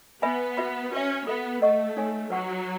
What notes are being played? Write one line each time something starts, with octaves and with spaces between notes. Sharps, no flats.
B3 B4 E5 G#5 B5
F#4 B4 E5 B5
C#4 F#4 B4 E5
B3 A4 E5 B5
A3 B4 D#5 F#5 C#6
D#4 A4 C#5 G#5
F#3 B4 F#5 C#6